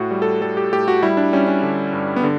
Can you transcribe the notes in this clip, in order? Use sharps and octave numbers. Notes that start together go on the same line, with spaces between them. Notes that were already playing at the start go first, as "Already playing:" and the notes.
Already playing: A2 F#4
G3
A4
G3 A4
G4
A2 G4
F#4
G3 E4
D4
G3 C#4
C#4
D3
G2
B3
D3